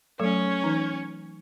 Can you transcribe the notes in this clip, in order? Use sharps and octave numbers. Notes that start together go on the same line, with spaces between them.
F#3 A3 C#4 A4 C#5
E3 D#4